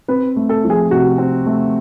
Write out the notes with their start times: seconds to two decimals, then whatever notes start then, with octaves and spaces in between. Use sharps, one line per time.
0.08 C4 B4
0.36 A3
0.49 A4
0.64 F3
0.70 G#4
0.90 C3 F#4
1.18 C4
1.46 A3